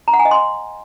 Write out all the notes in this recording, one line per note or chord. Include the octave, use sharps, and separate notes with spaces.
A#5
F#5
G#5
D#5
C6